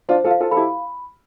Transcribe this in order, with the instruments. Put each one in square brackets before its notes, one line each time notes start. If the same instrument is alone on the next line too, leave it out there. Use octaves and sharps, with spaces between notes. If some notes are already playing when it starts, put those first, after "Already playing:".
[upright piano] D4 F4 [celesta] C5
[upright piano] F4 A4
[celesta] F5
[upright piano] F4 A4
[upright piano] A4 [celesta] B5
[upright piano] E4 G4